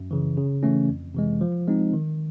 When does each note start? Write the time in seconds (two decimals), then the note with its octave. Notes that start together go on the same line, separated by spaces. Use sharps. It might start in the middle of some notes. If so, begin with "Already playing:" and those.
Already playing: F#2
0.11 C#3 E3
0.37 C#3
0.63 E3 A3 C#4
0.88 F2
1.15 C3 E3 G#3
1.41 F3
1.68 G#3 C4 D#4
1.93 D#3